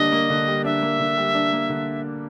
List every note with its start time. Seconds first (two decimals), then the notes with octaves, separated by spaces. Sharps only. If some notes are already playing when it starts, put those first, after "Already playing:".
Already playing: D3 G3 A#3 D4 D#5
0.12 A#3
0.30 D3
0.47 G3
0.64 D4 E5
0.83 A#3
1.00 D3
1.17 G3
1.34 D4
1.53 A#3
1.70 D3